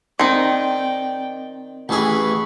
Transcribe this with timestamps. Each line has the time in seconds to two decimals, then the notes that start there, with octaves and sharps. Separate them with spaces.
0.19 D#3 C4 D#4 D5 G5 C6
1.89 A1 E3 G#4 B5 C#6